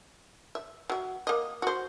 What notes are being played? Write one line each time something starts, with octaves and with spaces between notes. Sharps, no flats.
E5
F#3 E5
A#3 D#5
F#4 C5